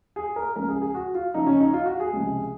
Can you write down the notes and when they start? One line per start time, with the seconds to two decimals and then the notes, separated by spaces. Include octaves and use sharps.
0.16 G#4
0.36 A#4
0.55 C#2 C#3 F3 A#4
0.68 G#4
0.82 G#4
0.95 F#4
1.15 F4
1.34 F#2 C#3 F3 D#4
1.46 C#4
1.60 D#4
1.74 F4
1.86 F#4
2.00 G#4
2.13 C#2 C3 F3